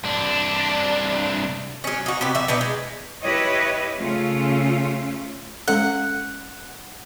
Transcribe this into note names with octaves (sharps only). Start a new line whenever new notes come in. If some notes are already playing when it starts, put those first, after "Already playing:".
C2 D4
F#3 C#4
D#4 F#4
C3 G4 B4
F3 E5
B2 D4 D#4 B4
G#3
E4 G4 B4 C#5 D#5
C#3 A3 C#4 F4
G#3 C#4 A4 F#5